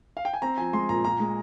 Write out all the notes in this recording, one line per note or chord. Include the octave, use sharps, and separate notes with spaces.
F5
G5
G#5
C4 A#5
F3 G#5
G#3 C6
A#2 A#5
A#2 A#5
G#3